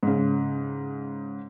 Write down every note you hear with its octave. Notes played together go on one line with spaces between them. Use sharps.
G#2 C#3